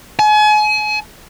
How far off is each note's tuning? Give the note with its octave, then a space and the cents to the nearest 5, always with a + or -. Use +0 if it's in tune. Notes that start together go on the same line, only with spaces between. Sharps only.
G#5 +35